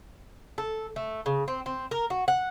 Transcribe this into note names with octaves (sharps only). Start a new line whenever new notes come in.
A4
A3
C#3
C4
C4
A#4
F#4
F#5